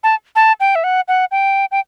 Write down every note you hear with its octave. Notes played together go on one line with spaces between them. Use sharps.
A5
A5
G5
E5
F#5
F#5
G5
G5